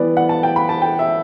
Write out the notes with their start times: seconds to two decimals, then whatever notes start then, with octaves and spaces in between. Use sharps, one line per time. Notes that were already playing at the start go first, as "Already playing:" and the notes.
Already playing: E3 G3 B3 B4 D5
0.17 F#5
0.29 A5
0.43 G5
0.56 B5
0.69 A5
0.82 G5
0.99 E5